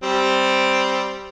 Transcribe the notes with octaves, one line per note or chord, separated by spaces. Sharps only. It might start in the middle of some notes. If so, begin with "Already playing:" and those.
G3 C4